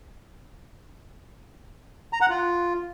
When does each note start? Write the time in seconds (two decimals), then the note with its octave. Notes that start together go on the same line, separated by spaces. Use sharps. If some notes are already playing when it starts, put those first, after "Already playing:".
2.13 A#5
2.21 F#5
2.30 F4